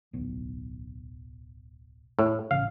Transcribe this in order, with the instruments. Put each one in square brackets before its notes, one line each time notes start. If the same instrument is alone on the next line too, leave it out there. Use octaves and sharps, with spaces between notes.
[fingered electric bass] D1 B1
[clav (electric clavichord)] A2
[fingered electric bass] A1 C#3 [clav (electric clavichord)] F5